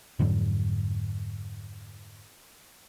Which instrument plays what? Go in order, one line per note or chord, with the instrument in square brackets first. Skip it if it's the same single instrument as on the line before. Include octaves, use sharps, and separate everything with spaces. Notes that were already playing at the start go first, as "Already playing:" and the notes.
[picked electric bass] F2 G#2 D3 F#3